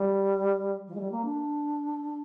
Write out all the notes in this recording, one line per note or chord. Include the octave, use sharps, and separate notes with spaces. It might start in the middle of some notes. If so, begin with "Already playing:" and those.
Already playing: G3
F3
G#3
G3
A#3
D4